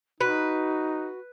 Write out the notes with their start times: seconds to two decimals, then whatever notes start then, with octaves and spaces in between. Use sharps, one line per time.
0.21 D#4 F#4 B4